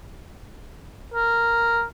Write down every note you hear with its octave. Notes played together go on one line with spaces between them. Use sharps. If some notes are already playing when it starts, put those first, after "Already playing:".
A#4